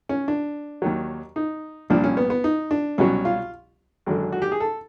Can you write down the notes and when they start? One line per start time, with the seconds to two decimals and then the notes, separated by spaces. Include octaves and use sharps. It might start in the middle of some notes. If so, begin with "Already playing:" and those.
0.09 C#4
0.28 D4
0.82 D#2 D#3 F#3
1.36 D#4
1.90 C2 A#2 F3 D4
2.04 C#4
2.17 B3
2.30 B3
2.44 D#4
2.71 D4
2.98 C2 B2 F#3 C#4
3.25 F4
4.06 G#1 F#2 D3
4.32 F#4
4.42 G4
4.52 G#4
4.60 A4